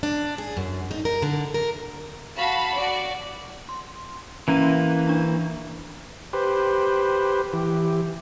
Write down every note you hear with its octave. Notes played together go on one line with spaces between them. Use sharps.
D4
G#4
F#2
D#4
A#4
D3
A#4
F#4 F5 A5 B5
F#4 D5
C6
E3 A#3 C#4 A#5 D#7
D4 A#5
G4 B4 C5
E3 G4